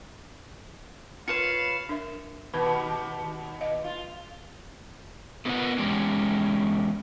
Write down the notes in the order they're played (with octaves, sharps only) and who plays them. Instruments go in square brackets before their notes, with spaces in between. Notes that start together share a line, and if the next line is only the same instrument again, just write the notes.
[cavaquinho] F4 B4 C#5 [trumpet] F5 [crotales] C#7 E7
[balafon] D4 A#4 E5
[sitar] D#2 B2 [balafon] B4 B5
[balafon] D#5 F5
[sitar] F4
[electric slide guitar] A3 B3 F4 A#4 B4 F#5
E2 G#3 C#4 G4